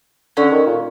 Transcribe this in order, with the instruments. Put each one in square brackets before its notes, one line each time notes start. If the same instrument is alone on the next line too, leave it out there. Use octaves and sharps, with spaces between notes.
[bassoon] D3 [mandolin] C#4
[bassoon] D#3
A#2